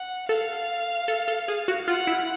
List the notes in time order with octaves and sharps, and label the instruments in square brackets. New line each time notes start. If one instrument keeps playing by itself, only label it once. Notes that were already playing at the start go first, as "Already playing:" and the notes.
Already playing: [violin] F#5
[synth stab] A4 [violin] F5
[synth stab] A4
A4
G#4
F#4
[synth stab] F4 [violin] F#5
[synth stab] E4